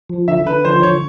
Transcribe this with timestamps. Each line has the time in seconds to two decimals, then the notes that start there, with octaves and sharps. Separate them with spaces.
0.10 F3
0.28 D3 E5
0.46 D3 B4
0.65 F3 C5
0.76 C5
0.83 D3 C#5